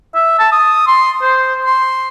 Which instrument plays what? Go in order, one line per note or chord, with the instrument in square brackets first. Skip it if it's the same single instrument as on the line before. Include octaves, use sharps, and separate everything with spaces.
[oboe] E5
A5
D#6
C6
C5
C6